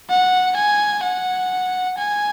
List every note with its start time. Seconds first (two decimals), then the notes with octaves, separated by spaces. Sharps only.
0.09 F#5
0.56 G#5
1.03 F#5
1.98 G#5